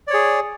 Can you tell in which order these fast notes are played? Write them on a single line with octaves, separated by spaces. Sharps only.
D5 C#5 G#4